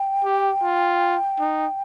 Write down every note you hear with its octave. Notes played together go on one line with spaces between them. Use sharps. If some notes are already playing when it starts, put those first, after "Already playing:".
Already playing: G5
G4
F4
D#4